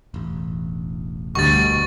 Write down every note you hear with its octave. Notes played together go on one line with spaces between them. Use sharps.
E1 A1
D2 B2 G3 B3 C#6 A6